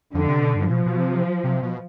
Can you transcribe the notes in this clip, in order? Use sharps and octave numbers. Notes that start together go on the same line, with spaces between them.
F2 D3
C3
B2
G2
B2 F3
B2
C3
C3
B2